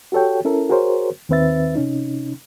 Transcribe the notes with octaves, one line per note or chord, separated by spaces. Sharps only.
F#4 G4 A4 C#5 G5
C#4 E4 A4 A#4
F#4 G#4 A#4 C5 C#5
D#2 D#3 C4 B4 E5 A6
C3 C#4 D#4